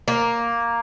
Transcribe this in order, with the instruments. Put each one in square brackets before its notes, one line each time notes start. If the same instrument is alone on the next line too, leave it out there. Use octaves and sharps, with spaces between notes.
[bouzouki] A#3